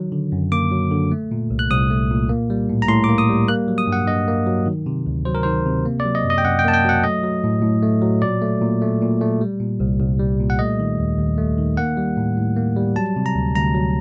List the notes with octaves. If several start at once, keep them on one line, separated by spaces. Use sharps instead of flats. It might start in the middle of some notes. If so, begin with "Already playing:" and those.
Already playing: D#3 F#3
D3
F#2
A#3 D6
F#3
D3
A3
A#2
C2
F#6
C2 D#6
A3
A#2
A#3
G3
A2
A#5
A2 C6
D6
A#3
D#6
G3
A#3 F#6
F#3
D#6
G2
F#5
G2 D#5
A#3
F#3
D#3
C3
D2
F#3 C5
A#4
D#3 C5
C3
A#3
D5
F#3
D#5
F#2
D#5
G5
F#2 F#5
G5
A#3 A5
G5
F#3 F#5
A3 D#5
F#3
A2
A2
A3
F#3
A#2 D5
A3
A#2
A3
A#2
A3
G3
A#2
C2
C2
G3
A#2
F#5
A3 D#5
D#3
D#2
D#2
A3
D#3
A#3 F#5
G3
A2
A2
A#3
G3
F#3 A5
C3
A#5
D2
D2 A#5
F#3